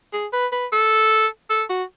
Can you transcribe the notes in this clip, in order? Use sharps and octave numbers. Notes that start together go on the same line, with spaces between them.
G#4
B4
B4
A4
A4
F#4